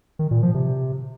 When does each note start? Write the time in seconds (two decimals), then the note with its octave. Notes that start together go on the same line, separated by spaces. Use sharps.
0.19 D#3
0.31 A#2
0.43 F3
0.54 C3